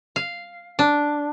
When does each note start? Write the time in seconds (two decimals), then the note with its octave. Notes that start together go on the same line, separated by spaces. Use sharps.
0.16 F5
0.79 D4